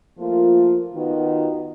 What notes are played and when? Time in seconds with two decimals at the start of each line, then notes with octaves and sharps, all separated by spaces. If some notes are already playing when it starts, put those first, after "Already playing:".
0.19 F3 A3 A#3 F4
0.94 D#3 B3 D#4 F4 F#4